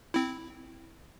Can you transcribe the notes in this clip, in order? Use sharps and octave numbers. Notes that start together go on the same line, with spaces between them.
C4 E4